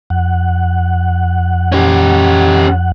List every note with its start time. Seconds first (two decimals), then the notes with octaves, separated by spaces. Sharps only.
0.10 F2 F#5
1.72 C#4 G4